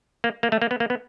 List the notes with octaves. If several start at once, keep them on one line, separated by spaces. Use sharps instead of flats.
A#3
A#3
A3
A#3
B3
A#3
B3